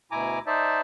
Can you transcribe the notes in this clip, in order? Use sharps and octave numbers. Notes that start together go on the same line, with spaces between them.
D2 B2 E4 G#5 A#5 D6
D#4 C5 D5 E5 A5